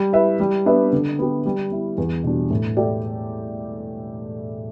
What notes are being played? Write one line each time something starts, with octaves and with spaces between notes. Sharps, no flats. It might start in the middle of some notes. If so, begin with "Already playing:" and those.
Already playing: G3
E4 B4 E5
G3
B3 D4 B4 E5
D3
B3 G4
G3
B3 E4
E2
B2 G3 D4
A2
A3 G4 D5